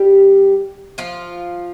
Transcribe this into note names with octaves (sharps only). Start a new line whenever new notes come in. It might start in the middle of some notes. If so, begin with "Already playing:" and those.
Already playing: G3 G4
F3 F4